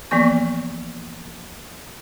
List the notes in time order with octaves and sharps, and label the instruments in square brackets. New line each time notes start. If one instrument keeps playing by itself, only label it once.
[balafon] E3 F3 A#3 B3 C#6